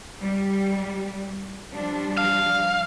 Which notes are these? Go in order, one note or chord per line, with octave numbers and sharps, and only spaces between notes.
G3
F3 G3 D4
F5